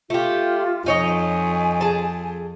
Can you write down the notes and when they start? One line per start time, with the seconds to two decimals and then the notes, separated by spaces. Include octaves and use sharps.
0.10 A3 F4 G4
0.86 F2 D#4 C#5 D#5 G#5
1.81 G#4 A5